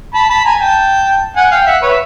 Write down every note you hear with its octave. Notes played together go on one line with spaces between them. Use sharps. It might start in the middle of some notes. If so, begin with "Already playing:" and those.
A5 B5
A5 B5
G#5 A#5
G5 A5
F#5 G#5
F5 G5
E5 F#5
B4 C#5
E5